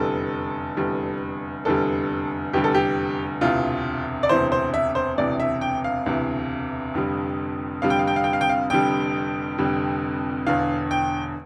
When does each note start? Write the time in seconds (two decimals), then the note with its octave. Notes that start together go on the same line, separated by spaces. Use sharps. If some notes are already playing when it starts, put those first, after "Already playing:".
Already playing: F1 E2 D3 G3 A4
0.77 F1 E2 D3 G3
1.65 F1 E2 D3 G3 A4
2.53 F1 E2 D3 G3 G4
2.64 A4
2.74 G4
3.41 E1 D2 C3 E3 F4
4.23 D5
4.29 E1 D2 C3 E3 C5
4.52 C5
4.74 E5
4.95 C5
5.18 E1 D2 C3 E3 D5
5.40 E5
5.61 G5
5.84 F5
6.06 E1 D2 C3 E3
6.94 F1 F2 D3 G3
7.82 F1 F2 D3 G3 F5
7.90 G5
7.99 F5
8.07 G5
8.16 F5
8.24 G5
8.33 F5
8.41 G5
8.49 F5
8.70 F1 F2 D3 G3 G5
9.58 F1 F2 D3 G3
10.47 E1 E2 D3 F5
10.91 G5